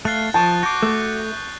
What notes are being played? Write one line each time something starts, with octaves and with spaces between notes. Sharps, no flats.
A3 F5 F#6 A6 G7
F3 A5 C#6 D#6 G6
F#4 D6 G6 C7
A3